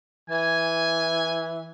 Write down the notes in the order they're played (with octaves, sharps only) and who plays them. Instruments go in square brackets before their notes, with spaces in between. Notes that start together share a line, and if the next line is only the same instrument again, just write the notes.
[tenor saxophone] E3 [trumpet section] G#5